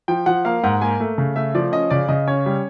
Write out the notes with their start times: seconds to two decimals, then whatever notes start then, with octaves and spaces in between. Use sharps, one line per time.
0.08 F3 G5
0.26 F3 F#5
0.45 A#3 F5
0.64 G#2 F#5
0.82 A#3 G#5
1.00 A3
1.18 C#3
1.36 A3 E5
1.55 F3 D5
1.72 C#4 D#5
1.90 C#3 D5
2.09 C#3 D#5
2.28 C#4 C#5
2.46 G3